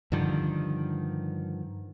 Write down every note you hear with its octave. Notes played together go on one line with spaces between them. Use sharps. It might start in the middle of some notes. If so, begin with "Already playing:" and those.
G2 D3 D#3 F3